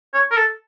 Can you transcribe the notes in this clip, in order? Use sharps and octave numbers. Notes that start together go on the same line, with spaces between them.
C#5
A#4
A4